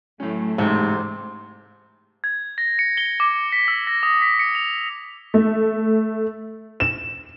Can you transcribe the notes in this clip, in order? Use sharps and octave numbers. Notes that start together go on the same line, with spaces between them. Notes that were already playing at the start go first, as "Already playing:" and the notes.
A2 F#3 A3 C#4
A1 G#2 C3 A5
G#6
A#6
C#7
G7
D6
B6
E6
A#6
D#6
B6
C#7
F7
A3
E7